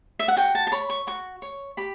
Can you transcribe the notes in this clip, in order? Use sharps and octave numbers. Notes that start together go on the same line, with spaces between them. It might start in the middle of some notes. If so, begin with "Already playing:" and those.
E5
F#5
F#4 G5
A5
A5
C#5 B5
C#6
F#4 C#6
C#5
G4 B5